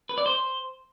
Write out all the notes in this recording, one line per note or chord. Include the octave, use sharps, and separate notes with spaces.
B4
D5
C5